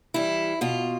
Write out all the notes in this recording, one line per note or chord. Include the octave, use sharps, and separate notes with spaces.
E3 G3 E4
B2 F4